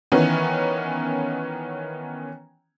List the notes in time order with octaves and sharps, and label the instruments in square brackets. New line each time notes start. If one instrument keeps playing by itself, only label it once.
[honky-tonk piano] D#3 E3 B3 C#4